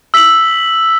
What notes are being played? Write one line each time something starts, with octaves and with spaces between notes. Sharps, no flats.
E6 B6 F#7